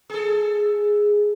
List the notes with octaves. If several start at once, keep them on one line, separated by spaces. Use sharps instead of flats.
G#4 A4